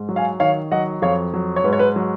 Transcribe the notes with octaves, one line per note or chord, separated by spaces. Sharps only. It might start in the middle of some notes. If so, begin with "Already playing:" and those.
Already playing: G#2
F#3
F5 G#5
D#3 C#5 F5
F#3 D#5 F#5
F2 C#5 F5
F#3
C#5
G#2 B4
C#5
B4
F#3